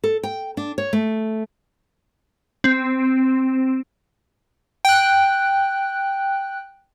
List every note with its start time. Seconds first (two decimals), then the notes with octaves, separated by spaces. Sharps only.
0.04 A4
0.23 G5
0.57 D4
0.78 C#5
0.93 A3
2.64 C4
4.85 G5 F#6